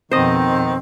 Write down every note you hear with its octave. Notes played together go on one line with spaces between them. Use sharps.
F2 B2 D#3 C4 C5 D#5